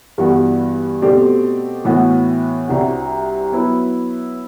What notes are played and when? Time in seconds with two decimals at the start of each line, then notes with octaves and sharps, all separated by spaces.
0.18 G2 E3 G3 B3 F#4
1.02 B2 A3 C4 G4 D5
1.85 A2 E3 B3 F#4
2.68 C2 C3 G3 D4 F#4
3.52 F#3 B3 E4 B4